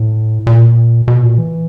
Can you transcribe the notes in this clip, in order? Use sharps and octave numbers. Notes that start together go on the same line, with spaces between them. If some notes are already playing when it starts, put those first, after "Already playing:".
Already playing: A2
A#2
B2
A#2
E3